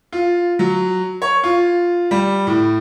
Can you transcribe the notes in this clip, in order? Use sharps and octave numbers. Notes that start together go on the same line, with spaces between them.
F4
F#3
C#5
F4
G3
A2